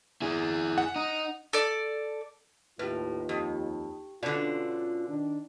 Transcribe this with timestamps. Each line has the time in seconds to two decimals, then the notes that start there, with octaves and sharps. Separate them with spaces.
0.22 E4 G#4
0.78 F#5
0.96 D#4
1.53 A4 D5
2.79 D#2 A2 D#4 F4 G4 B4
3.29 F2 G4
4.23 B2 D3 C#4 F4 D5
5.08 D#3 D4